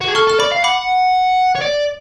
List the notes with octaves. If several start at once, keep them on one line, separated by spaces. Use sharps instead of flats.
F#4
G#4
A4 C#6 F6
A4 F6
D5 B5 D6
F5
F#5 B5 D6
C#5
D5